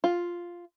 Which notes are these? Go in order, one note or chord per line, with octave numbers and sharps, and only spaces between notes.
F4